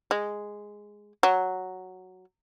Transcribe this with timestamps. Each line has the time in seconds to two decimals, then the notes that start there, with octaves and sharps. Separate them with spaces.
0.11 G#3
1.23 F#3